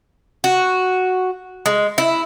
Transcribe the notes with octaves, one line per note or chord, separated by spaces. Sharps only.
F#4
G#3
E4